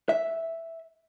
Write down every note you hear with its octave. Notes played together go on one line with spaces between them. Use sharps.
E5